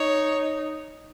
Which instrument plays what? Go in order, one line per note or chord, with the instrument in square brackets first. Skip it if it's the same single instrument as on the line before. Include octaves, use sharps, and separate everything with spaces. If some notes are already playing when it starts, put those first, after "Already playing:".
Already playing: [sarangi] D#4 [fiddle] C#5